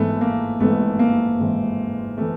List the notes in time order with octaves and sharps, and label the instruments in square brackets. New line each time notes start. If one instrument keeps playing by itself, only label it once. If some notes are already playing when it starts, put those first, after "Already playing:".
Already playing: [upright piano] G#1 G#2 E3 A3 B3
A#3
G#1 G#2 E3 A3 B3
A#3
G#1 G#2 E3
E3 A3